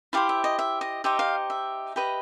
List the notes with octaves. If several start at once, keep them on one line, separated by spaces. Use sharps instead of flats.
E4 G4 C5 F5
E5
D#5
E5
D#5
D#4 G4 C5 D#5 E5
F5
E5
G4 B4 D#5